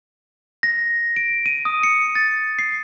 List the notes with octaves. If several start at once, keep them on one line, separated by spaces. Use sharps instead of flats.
A#6
D7
D#7
D#6
C#7
A6
C7